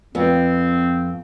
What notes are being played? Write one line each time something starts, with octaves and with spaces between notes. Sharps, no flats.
F2 B3 C4